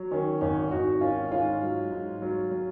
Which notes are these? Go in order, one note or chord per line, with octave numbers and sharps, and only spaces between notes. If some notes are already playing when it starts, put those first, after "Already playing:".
Already playing: F#3
D#3 C#4
G#1 C#4
G#1 D#4 F#4
D#3 C#4 F4
G#2 C#4 F4
F#3
G#2
F#3
F#3